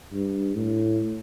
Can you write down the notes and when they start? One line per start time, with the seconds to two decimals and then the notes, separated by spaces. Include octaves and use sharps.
0.12 G2
0.56 A2